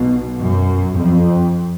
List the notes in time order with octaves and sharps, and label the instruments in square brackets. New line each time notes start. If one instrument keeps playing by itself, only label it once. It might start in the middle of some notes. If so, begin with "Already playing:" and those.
Already playing: [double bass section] B1 B2
F#2
F2